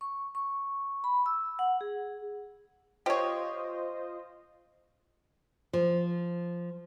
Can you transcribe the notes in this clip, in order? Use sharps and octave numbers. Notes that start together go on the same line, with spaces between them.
C#6
C#6
B5
E6
F#5
G#4
F4 G4 C5 C#5 D#5
F3